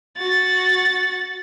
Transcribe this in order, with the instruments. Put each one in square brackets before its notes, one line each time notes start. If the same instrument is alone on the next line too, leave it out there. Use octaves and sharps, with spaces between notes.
[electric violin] F#4 A6